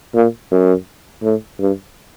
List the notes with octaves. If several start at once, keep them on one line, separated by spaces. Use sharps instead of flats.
A#2
F#2
A2
G2